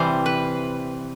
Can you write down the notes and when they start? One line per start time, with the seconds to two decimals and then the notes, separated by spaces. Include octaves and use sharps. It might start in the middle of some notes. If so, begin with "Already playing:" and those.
Already playing: C3 E3 G3 C5
0.26 B4